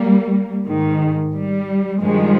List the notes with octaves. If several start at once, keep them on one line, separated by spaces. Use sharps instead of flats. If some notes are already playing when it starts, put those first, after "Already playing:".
Already playing: G3 A#3
G#2 D#3
G3
G2 D#3 F3 G#3